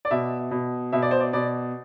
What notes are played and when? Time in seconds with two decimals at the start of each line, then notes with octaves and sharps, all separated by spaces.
0.05 D5
0.11 B2 E5
0.51 B2
0.92 B2 E5
1.02 D5
1.11 C5
1.20 D5
1.33 B2 D5